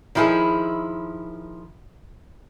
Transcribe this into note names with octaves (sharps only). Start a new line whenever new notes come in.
D#3 F3 E4 G#4 A4